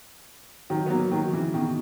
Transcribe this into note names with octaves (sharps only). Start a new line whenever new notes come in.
D#3 F#3
B3
F#3 A#3
D#3 F#3
C#3 E3
B2 D#3